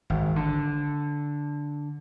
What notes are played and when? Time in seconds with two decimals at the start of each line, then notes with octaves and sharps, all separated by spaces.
0.10 G#1
0.36 D3